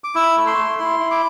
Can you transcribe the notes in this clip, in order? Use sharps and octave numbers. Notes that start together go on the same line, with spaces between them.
D6
E4 E6
A3
C6
A3
E4 C6
E4
D6